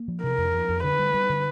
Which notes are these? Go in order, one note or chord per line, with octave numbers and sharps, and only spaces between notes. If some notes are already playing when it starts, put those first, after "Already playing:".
Already playing: A#3
F3
C3 A#4
F2
F3
F2
D3 B4
G3
G3
D3